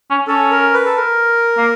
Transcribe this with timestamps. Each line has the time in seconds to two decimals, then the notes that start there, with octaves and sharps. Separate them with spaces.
0.10 C#4
0.27 C#4 A4
0.51 A#4
0.74 B4
0.86 A4
0.96 A#4
1.57 A#3